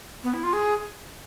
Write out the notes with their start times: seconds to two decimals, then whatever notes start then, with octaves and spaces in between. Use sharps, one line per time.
0.24 B3
0.34 E4
0.43 F4
0.53 G#4